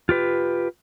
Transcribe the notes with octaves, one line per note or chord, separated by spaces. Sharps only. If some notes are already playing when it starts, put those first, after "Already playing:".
F4 G4 B4